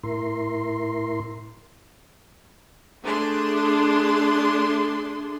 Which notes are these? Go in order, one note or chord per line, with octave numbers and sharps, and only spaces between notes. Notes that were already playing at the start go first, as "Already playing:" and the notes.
A2 E4 A#4 C6
A3 D4 G#4 C6